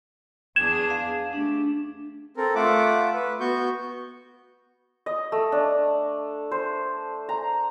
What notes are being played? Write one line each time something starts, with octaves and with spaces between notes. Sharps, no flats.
E2 D4 G#4 G#6 E7
F5
A3 D4 G4
C4 A4 A#4
A3 F4 E5 F#5 D6
B4
B3 F#4 C#6 G6
D#5
A3
D4
C5
A#5